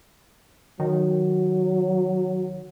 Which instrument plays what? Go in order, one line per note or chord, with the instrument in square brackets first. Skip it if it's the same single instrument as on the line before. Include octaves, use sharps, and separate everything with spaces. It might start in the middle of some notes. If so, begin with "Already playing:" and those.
[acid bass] D#3 [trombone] F#3